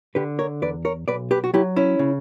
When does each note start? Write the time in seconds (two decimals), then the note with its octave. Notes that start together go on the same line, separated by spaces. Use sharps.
0.15 D3 G4 B4
0.39 A#4 C#5
0.62 E2 B4 D5
0.85 A#4 C#5
1.08 B1 B4 D5
1.31 G4 B4
1.44 F#4
1.54 F#3 E4 G4
1.76 C#4 E4
1.99 C#3